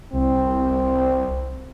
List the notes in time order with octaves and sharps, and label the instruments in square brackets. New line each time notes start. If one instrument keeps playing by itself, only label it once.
[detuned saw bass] C2 [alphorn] C4